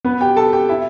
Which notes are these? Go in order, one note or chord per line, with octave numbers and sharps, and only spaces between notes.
B3 B4
G4 G5
A4 A5
G4 G5
E4 E5